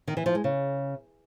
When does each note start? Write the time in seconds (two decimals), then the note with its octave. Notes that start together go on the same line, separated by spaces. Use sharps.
0.07 D#3
0.17 E3
0.26 F3
0.35 G#3
0.44 C#3